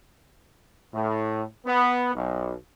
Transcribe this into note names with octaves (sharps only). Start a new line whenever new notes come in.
A2
B3
B1